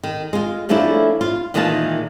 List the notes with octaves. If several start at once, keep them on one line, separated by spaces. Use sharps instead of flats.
D#3
G#3 F4
F3 A3 A#3 C#4 D4 E4
F4
A#2 D#3 E3 G#3 A#3 A5